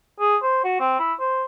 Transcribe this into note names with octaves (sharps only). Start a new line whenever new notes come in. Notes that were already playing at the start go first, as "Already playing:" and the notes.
G#4
C5
F#4
C4
E4
C5